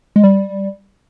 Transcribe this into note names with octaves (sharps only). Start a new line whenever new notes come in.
G#3
G3